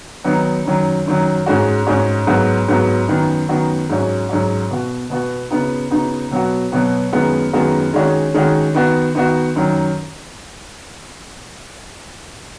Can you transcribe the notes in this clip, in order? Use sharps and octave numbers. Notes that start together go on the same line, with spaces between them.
D#3 F#3 B3 D#4
F#2 D#3 F#3
F#2 D#3 F#3
G#2 G#3 C#4 F#4
G#2 G#3 C#4 F#4
G#2 F#3 B3 F#4
G#2 F#3 B3 F#4
F#2 D#3 B3 F#4
F#2 D#3 B3 F#4
G#2 F#3 C#4 F#4
G#2 F#3 C#4 F#4
B2 B3 F#4
B2 B3 F#4
C#3 B3 D#4 F#4
C#3 B3 D#4 F#4
B2 F#3 B3 F#4
B2 F#3 B3 F#4
F#2 D#3 G#3 B3 F#4
F#2 D#3 G#3 B3 F#4
D#3 G#3 C#4 F#4
D#3 G#3 C#4 F#4
D#3 B3 F#4
D#3 B3 F#4
F#2 D#3 F#3